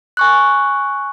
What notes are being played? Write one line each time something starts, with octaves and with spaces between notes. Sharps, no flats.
G#5 C#6 F#6